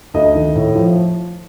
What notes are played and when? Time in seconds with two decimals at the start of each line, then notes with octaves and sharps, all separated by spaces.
0.14 D2 D#5
0.35 D#3
0.56 A2
0.75 F3